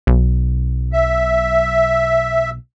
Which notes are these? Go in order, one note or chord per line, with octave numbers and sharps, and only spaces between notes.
B1
E5